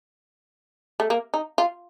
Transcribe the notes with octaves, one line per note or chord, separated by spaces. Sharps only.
A3
A#3
D#4
F4